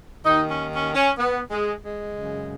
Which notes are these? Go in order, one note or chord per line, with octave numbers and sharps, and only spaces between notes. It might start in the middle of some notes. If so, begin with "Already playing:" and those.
D#2 D#3 D#4
C#4
C#4
C#4
B3
G#3
G#3
F#2 C#3